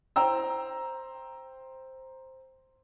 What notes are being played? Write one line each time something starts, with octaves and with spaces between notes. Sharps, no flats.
C5 G5 A#5 E6